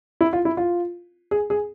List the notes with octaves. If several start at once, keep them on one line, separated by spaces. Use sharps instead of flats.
E4
F4
E4
F4
G#4
G#4